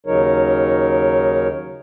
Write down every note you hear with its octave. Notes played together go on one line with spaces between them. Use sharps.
D#2 C#3 F#3 D#4 A#4 C#5